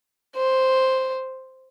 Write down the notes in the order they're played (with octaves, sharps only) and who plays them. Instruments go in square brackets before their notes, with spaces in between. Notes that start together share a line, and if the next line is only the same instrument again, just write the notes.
[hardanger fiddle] C5